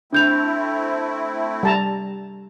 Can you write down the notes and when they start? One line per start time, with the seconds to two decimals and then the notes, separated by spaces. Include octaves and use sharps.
0.13 A3 C4 D4 E4 G6 F7
1.63 G3 A5 A#5